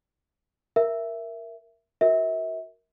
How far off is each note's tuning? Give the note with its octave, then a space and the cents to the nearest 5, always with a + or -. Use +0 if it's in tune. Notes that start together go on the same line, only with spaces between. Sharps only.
A#4 +0 E5 +10
F#4 +0 A#4 +0 E5 -35